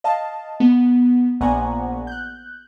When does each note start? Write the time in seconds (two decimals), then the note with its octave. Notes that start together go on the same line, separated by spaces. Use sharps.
0.04 D#5 F5 A5
0.60 B3
1.41 A#1 B3 F#5 G#5 A#5
2.07 F#6 G6